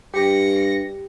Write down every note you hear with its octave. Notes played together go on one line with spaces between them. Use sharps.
G2 G4 A#6 C#7